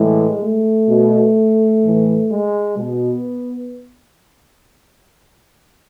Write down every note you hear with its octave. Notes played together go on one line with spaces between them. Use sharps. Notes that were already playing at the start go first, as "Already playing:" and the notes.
Already playing: A2 E3 G#3
A3
B2
A2 E3
G#3
B2 B3